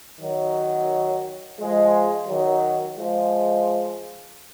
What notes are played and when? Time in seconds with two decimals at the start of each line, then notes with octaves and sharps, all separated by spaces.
0.21 D#3 F#3
1.59 F3 G#3
2.27 D#3 F#3
2.96 F3 G#3